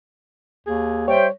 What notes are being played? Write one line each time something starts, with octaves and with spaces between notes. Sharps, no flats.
D#2 G#4
G3 C5 C#5 E5 G5